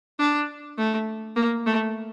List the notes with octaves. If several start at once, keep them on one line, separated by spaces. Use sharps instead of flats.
D4
A3
A#3
A3